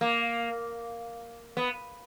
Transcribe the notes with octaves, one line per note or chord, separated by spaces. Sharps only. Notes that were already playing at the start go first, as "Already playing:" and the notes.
A#3
B3